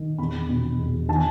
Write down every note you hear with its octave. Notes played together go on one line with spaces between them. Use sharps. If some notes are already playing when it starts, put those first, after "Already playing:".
Already playing: D#3
E2 B5
B2
E2
D#3 A5
G#5